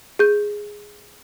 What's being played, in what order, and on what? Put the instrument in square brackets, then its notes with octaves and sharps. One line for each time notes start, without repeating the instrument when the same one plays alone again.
[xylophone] G#4 G6